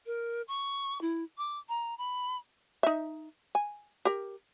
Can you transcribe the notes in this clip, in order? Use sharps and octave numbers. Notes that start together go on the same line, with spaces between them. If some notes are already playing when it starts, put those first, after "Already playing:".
A#4
C#6
E4
D6
A#5
B5
D#4 E5
G#5
G4 A#4